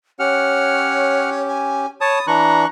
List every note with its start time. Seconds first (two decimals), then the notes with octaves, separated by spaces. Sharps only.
0.19 C#4 G4 C#5 F#5 F6
1.48 G#5
2.01 C#5 A5 B5 D#6
2.27 E3 D4 A#5 C#6 F#6